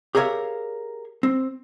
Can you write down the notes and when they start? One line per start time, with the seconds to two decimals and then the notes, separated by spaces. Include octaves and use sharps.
0.15 G4 G#4 A#4 C#5 E5 F5
1.23 C4